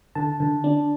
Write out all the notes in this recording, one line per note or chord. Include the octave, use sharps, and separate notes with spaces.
D3 A5
D3
D4